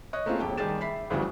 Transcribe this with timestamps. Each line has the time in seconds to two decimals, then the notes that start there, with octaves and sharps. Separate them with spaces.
0.13 C#5 D#5 F#6
0.26 A3 A#3 C4 C#4 F4 G#4
0.39 E1 G4 G5 A5
0.58 D#3 G3 G4 G#4 A6 E7
0.81 E5 B5 B6 C7
1.10 D2 C#3 E3 G3 F#4